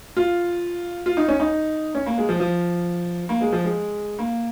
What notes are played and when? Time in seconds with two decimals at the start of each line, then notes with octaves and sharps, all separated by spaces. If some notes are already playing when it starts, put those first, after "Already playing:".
0.17 F4
1.06 F4
1.17 D#4
1.28 C#4
1.40 D#4
1.95 C#4
2.06 A#3
2.18 G#3
2.29 F3
2.40 F3
3.29 A#3
3.41 G#3
3.52 F3
3.64 G#3
4.19 A#3